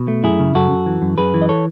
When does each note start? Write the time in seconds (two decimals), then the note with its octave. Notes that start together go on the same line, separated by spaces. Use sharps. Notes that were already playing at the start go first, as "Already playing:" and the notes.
Already playing: B2
0.08 A3
0.23 F#2 E4 G#4
0.39 C#3
0.55 F#2 F#4 A4
0.71 F#2
0.86 E3
1.02 F#2
1.18 F#2 G#4 B4
1.34 E3
1.42 D#5
1.49 A4 C#5